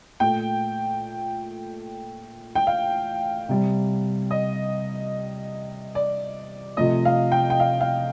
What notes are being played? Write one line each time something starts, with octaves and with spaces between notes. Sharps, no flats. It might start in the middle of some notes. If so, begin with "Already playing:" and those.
A#2 A3 G5
G5
F5
C3 G3
D#5
D5
C3 F3 A3 D#5
F5
G5
G5
F5
F5